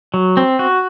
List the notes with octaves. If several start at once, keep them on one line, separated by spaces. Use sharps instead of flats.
F#3
C4
F#4